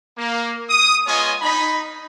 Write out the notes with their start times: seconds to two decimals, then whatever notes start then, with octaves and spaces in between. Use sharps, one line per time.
0.18 A#3
0.70 D#6
1.07 G#3 B3 F4 C#5 D#5 G#5
1.42 D#4 B5